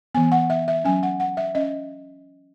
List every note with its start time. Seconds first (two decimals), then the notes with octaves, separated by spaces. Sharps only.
0.14 E3 B3 G#5
0.32 F#5
0.50 E5
0.68 E5
0.84 F#3 C#4 G#5
1.03 F#5
1.20 F#5
1.37 E5
1.55 C#4 D#5